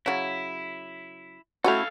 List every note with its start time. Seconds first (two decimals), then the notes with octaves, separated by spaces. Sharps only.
0.06 C#3 F#3 E4
1.64 A3 C#4 E4 F#4 A4 F5